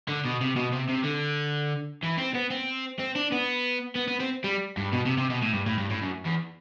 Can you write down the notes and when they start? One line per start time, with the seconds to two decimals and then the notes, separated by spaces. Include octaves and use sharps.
0.08 D3
0.25 B2
0.41 C3
0.56 B2
0.72 C3
0.89 C3
1.04 D3
2.03 E3
2.18 C4
2.34 B3
2.50 C4
2.99 C4
3.16 D4
3.32 B3
3.95 B3
4.08 B3
4.20 C4
4.44 G3
4.77 G2
4.92 B2
5.06 C3
5.18 C3
5.30 B2
5.42 A2
5.53 G2
5.66 A2
5.78 G2
5.90 A2
6.02 F#2
6.26 E2